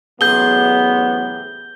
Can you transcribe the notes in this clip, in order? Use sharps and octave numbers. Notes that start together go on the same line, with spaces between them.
A1 C3 F#3 B3 G#4 G6 G7